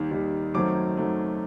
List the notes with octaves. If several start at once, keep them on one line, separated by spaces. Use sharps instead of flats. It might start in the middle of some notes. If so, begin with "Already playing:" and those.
Already playing: D#2 D#3 G3
D#2 D#3 G3
F#2 D#3 F#3 A3 C4 D6
F#2 D#3 F#3 A3 C4